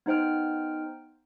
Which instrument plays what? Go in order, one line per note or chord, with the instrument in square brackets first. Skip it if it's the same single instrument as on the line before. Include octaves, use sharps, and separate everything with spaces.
[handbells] B3 D#4 C5 G5 F6